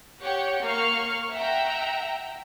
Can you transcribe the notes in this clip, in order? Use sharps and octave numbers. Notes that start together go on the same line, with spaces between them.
G4 C#5 F#5 C#6
A#3 F5 C#6 F6
E5 F#5 G5 A#5 E6